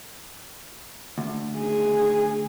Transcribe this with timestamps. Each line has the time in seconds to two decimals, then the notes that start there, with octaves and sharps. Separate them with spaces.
1.18 D2
1.58 G#4